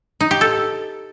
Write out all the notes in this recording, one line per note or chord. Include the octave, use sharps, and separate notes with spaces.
D#4
G4
A4